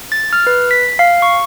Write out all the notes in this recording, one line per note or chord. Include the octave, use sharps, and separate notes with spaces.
A6
F6
B4
B6
F5
C#6